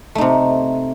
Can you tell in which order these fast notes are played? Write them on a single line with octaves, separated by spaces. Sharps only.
A3 D#4 C3